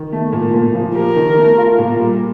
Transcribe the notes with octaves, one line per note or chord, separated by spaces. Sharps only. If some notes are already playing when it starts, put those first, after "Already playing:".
Already playing: D#3
A3
A#2
A#2
F3
G4 A#4
D#3
A3
F4
A#2
G3